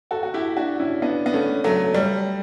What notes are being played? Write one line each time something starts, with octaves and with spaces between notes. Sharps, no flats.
F#4 A4
F#4
E4 G4
D4 F#4
C#4 E4
B3 D4
B3
A3 C#4
F#3 A3
G3